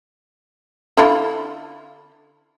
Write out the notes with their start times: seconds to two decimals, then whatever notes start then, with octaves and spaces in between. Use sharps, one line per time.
0.97 D3 E4 F4